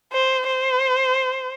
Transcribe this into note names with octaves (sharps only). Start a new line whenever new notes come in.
C5
C5